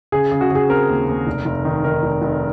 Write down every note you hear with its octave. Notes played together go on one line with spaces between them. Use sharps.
C#3 G#4
C#3
F#4
C#3 G#4
C4 A#4
D#2
D#2
F1
F1
D#3
D#3 A#4
F1
F1